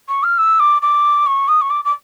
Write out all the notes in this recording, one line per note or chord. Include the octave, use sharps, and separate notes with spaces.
C#6
F6
E6
D6
D6
C#6
D#6
C#6
D6
D6